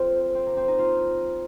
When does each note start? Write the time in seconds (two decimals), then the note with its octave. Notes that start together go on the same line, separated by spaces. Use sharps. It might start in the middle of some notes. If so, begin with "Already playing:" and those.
Already playing: C4 F4 A4
0.35 C4
0.46 A#3
0.57 C4
0.68 D#4
0.79 F4